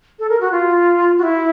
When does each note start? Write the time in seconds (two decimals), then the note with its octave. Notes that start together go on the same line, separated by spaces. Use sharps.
0.19 A4
0.29 A#4
0.41 F#4
0.52 F4
1.18 F#4
1.23 E4